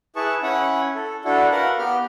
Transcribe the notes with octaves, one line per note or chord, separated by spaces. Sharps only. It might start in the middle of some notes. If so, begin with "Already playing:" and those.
E4 G#4 B4 A5 C#6
C#4 E4 C#5 F#5
A4
D4 E4 F#4 A4
A#4 B4 F5 F#5
B3 G4 F6